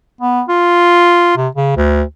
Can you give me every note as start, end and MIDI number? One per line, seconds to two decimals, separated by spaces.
0.21 0.43 59
0.49 1.33 65
1.37 1.48 48
1.55 1.72 49
1.77 2.03 38